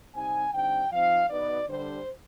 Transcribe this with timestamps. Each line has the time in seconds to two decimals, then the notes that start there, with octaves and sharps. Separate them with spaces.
0.15 C3 G3 C4 D#4 G#5
0.54 D3 G3 C4 D#4 G5
0.92 F3 C4 D#4 F5
1.30 B2 B3 D#4 D5
1.68 D3 G3 D4 C5